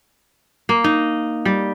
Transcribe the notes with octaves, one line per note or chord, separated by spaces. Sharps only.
A#3
D#4
G3